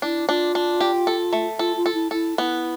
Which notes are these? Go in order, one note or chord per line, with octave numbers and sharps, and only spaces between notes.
D4 E4
D4 F4
D4
G4
A4
A3
F4 A4
F4
A4
E4
E4 A4
B3 E4